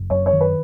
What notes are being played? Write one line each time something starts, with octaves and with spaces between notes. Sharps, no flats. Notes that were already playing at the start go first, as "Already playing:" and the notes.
Already playing: F#1
F#2 C#5
C#5
D#3
B4